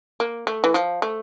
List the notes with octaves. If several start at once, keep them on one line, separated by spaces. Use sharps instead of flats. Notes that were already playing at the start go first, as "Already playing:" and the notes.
A#3
A3
E3
F3
A3